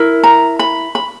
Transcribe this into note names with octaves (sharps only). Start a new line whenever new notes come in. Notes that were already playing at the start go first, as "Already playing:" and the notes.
Already playing: E4 A#4
A#5
B5
B5